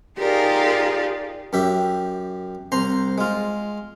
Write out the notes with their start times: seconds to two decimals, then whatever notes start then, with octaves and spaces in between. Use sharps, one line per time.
0.18 D#4 F4 G4 G#4 A#4 D5
1.53 F#2 G4 E5
2.72 C2 C5 A#5 C6
3.18 G#3 F4